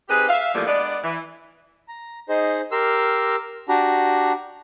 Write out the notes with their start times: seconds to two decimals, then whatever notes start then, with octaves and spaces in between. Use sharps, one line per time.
0.09 C4 D#4 G4 G#4 B4
0.28 E5 F5
0.54 E2 D3 F3 G3 A3 A#3
0.67 G#3 B3 D4 D5
1.03 E3
1.88 A#5
2.29 D#4 G#4 C5 D#5
2.72 G4 A#4 C6 E6 F6
3.69 D4 F#4 G4 A#5